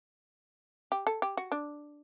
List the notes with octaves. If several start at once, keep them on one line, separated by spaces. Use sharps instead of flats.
G4
A4
G4
F#4
D4